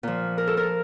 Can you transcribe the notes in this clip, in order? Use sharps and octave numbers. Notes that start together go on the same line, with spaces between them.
A#2 F3
A#4
A4
A#4